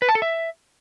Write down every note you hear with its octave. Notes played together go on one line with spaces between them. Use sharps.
B4
A5
A4
E5